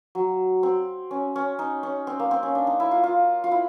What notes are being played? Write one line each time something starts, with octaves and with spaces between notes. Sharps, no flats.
F#3
C4
C#4
C#4
D#4
C#4
C4
A#3
C4
C#4
D4
D#4
E4
F4
F4
F4
E4